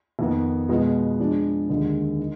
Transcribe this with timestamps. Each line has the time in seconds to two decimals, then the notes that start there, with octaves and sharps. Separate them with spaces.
0.19 F2 D#3 B3
0.69 B2 G#3 B3 F4
1.19 F3 G#3 D4 G#4
1.69 D#2 D3 G#3
2.19 D#4